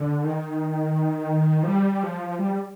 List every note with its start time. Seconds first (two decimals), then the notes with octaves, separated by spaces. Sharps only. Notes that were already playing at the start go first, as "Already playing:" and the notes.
Already playing: D3
0.24 D#3
1.63 F3
1.67 G3
2.03 F3
2.39 G3